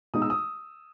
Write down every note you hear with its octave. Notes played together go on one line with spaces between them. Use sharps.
B2 G#3 D#4 D#6
E6
D#6